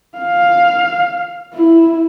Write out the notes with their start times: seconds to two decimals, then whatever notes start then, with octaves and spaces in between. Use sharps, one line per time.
0.18 F5
1.54 E4